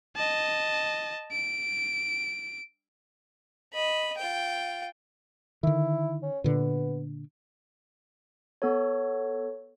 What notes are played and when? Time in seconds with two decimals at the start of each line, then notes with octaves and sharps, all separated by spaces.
0.16 D#5 A5
1.32 D7
3.72 D#5 B5
4.17 F4 G5
5.63 D3 D#3 E4
6.23 C#4
6.44 A#2 D3 B3
8.62 B3 A4 C#5